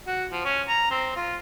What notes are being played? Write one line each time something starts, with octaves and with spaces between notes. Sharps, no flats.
F#4
F3
C#4
A#5
C4
F4